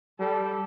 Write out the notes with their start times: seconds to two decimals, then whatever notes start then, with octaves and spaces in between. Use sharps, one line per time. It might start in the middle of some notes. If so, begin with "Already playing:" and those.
0.20 G3 A4